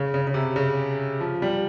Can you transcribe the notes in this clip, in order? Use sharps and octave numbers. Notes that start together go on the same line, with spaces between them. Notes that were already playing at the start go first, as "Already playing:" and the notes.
Already playing: C#3
C#3
C#3
C3
C#3
F3
G3